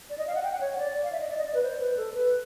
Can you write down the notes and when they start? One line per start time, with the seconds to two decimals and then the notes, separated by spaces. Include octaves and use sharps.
0.10 D5
0.18 D#5
0.27 F5
0.35 F#5
0.43 G5
0.52 F#5
0.61 C#5
0.78 D5
1.04 F5
1.12 E5
1.20 D#5
1.29 D5
1.38 D#5
1.46 D5
1.54 B4
1.63 C5
1.80 B4
1.97 A4
2.14 B4